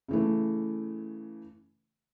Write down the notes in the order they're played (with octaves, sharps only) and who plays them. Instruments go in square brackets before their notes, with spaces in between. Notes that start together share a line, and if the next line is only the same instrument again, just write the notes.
[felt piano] C#3 E3 A3